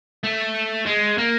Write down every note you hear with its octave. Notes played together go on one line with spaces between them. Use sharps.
A3
G#3
A#3